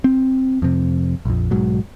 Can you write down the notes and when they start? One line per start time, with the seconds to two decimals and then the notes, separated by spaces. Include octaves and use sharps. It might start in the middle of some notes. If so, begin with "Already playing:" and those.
0.04 C4
0.62 F2 C3
1.25 A#1 F2
1.51 B1 G#2 F#3